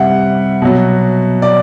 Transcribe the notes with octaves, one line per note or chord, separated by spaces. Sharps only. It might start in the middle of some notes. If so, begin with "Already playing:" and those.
Already playing: C3 G3 E5 F#5
B2 F#3
D5